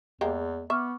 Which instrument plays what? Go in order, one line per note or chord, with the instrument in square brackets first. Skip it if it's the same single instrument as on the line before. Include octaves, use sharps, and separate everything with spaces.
[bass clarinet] E2 [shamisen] G#3 A#3 G4
[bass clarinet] B3 [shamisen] E5 [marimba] C#6 D6 F6